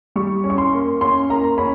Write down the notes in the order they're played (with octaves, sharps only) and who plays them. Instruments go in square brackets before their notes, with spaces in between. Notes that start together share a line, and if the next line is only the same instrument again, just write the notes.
[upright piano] G3 C#6
C#4
C#6
C6
A#3
C#4 C6
A#3 A#5
C#4 B5